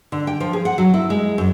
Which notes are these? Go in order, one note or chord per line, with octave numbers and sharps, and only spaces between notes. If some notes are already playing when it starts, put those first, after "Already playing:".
D3
G5
F3
G#4
F#5
F#3
E4
G#3
F#2